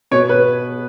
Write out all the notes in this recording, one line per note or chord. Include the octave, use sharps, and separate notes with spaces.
B2 B3 C#5
B4